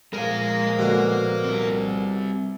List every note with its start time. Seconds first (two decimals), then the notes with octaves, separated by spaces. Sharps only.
0.14 A#2 F3 G#3 A#4 F5
0.79 B2 D3
1.45 G3 C4